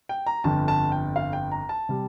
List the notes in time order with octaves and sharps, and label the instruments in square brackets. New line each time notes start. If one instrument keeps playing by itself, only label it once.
[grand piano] G5
A#5
G1 F2 D3 A5
A5
G5
F5
G5
A#5
A5
C3 G3